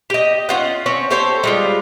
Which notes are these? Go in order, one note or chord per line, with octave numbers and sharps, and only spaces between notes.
G4 D#5
C#4 F4 F#5
C4 C#4 C#5
G4 A4 C5 C#5
G3 G#3 F4